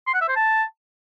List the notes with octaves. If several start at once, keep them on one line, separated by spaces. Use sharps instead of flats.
C6
F#5
E5
C5
A5